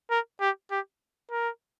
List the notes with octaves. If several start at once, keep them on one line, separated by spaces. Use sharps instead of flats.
A#4
G4
G4
A#4